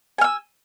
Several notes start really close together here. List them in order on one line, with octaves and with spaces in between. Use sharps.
G#5 F6 E6